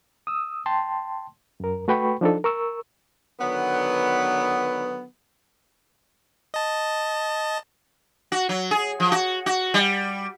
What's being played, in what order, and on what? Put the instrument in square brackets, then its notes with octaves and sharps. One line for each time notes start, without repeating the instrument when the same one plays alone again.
[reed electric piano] D#6 E6
G5 A5 C6
F#2 A#4
A3 F#4 B4 G5 B5 C#6
F3 D4 D#4 A4
A#4 C#6 E6
[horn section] D3 D#3 F#3 B3
[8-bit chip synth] D#5 A5
[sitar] F#4
F#3
G#4
F3
F#4
F#4
G3